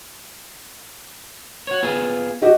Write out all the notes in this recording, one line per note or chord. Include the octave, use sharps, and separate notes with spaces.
F#4 C#5
B3 F4 G#4
F#4 G4 D#5